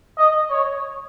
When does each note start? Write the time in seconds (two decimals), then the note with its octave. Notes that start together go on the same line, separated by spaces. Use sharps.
0.18 D#5
0.50 C#5